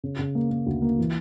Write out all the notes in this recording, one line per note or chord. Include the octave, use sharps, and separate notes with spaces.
C#3
C#3
A#3
A#3
D2
A#3
E3